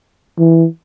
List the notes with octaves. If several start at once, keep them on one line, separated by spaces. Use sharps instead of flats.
E3